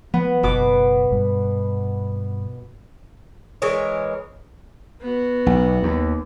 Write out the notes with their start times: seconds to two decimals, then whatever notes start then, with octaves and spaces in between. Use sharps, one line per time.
0.14 F3 B3
0.43 F#1 B2 D6
1.12 G2
3.62 E3 G#3 A#4 C#5
5.01 B3 F#4
5.46 B1
5.83 D#2